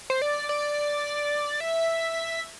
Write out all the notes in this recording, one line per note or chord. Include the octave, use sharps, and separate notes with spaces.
C5
D5
D5
E5